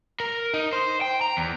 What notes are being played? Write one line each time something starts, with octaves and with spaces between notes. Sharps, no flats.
A#4
D#4
C5
G5
A#5
E2